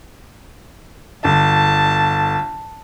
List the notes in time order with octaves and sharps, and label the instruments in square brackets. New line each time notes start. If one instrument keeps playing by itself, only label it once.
[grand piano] G1 [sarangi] A5